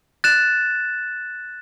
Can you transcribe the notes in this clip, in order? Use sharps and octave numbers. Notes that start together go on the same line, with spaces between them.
F#6 A6 E7